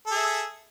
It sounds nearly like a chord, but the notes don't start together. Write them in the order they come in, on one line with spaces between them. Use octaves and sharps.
A4 G#4 E5